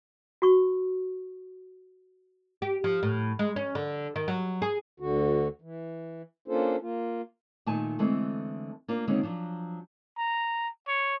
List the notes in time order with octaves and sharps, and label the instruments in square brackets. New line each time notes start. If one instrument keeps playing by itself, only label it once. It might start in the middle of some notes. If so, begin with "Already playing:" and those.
[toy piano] F#4 C#6
[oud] G4
F3
A2
G#3
C#4
D3
D#3
F#3
G#4
[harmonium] D2 D3 F#4
E3
A#3 C#4 D4 F4 A4 C5
A#3 F4
[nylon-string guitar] A#2 D#3 A3 B3 G#5 A5
D3 E3 G#3 A3 B3 C4
A#3 D4 F4
D3 D#3 G#3 A#3 C4 C#4
F3 F#3 D4
[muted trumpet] A#5
C#5